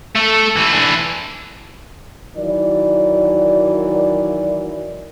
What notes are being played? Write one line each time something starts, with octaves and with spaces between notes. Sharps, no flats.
A3 A4
E3 A3
E3 D4
D#3 E3 F#3 D5